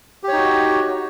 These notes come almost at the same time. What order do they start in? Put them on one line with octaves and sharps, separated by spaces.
G4 C#5 D#4 F#4